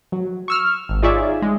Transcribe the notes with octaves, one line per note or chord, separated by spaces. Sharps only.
F#3
C#6 E6 F6
G#1
D#4 F4 G#4 C#5 D5 E5
G#3